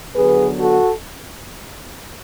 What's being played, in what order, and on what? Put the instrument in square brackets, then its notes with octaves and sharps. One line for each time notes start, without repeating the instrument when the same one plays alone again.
[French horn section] D3 F#3 B3 G#4 B4
F#4 A4